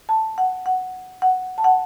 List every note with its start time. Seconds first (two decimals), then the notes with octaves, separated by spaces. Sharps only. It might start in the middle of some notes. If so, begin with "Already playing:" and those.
0.09 A5
0.38 F#5
0.66 F#5
1.22 F#5
1.58 A5
1.64 F#5